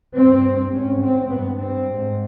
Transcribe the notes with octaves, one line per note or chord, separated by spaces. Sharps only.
G2 C4
G#2 C#4
C4
G2 B3
C4
G#2